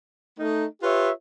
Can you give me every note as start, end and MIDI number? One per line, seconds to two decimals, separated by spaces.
0.39 0.65 57
0.39 0.65 63
0.82 1.10 65
0.82 1.10 67
0.82 1.10 71
0.82 1.10 73
0.82 1.10 76